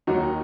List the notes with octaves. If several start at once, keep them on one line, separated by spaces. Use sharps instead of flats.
D#2 D#3 F#3 D#4 F#4